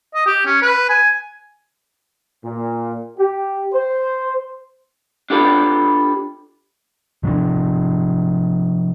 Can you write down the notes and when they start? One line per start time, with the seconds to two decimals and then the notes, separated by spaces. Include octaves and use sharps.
0.15 D#5
0.26 G4
0.45 C#4
0.62 B4
0.89 G#5
2.44 A#2
3.18 G4
3.73 C5
5.30 D4 F4 G4 A4 B4
7.23 C3 F3 C#4 D4